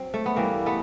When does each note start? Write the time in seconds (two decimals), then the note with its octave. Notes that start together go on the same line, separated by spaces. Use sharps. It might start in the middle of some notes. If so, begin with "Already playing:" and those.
Already playing: F#3 C4
0.14 A3
0.26 B3
0.36 G2 E3 G3 A#3
0.66 A3 B3